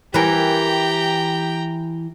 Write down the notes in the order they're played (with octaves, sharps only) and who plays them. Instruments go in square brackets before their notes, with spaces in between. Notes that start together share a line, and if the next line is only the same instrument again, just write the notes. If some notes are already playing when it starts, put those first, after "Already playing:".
[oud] E3 A#4 [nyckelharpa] G4 [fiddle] G5 A#5